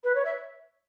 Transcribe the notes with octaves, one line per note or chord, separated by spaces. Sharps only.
B4
C#5
E5